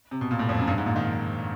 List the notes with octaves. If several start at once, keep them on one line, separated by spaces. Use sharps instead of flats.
C3
B2
A#2
A2
F2
F#2
G2
G#2
A#2
D#3